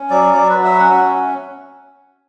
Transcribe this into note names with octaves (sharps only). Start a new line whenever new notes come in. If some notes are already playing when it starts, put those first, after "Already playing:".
Already playing: C#4
F#3 D5
F#3 D5
B4
F#4
E5
C#4 F#5
E5